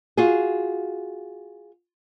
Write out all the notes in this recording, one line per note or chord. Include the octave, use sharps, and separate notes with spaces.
F4 F#4 G#4